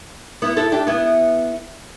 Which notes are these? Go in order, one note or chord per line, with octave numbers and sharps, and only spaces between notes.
B3 E4
E4 A4
D4 G4
B3 E4